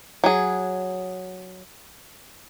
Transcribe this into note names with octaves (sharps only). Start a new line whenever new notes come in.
F#3 G#4